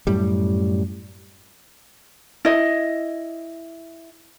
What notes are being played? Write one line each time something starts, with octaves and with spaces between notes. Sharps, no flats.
F#2 A2 G3
E4 D#5